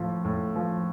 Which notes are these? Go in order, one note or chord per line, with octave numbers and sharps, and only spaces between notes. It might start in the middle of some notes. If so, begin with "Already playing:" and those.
Already playing: A2 F3
A2
F3